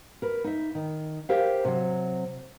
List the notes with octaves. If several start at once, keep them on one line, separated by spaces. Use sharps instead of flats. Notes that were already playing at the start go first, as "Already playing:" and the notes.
A#4 B4
D#4 E5
D#3
G4 A#4 C5 E5 F5
C3 F#3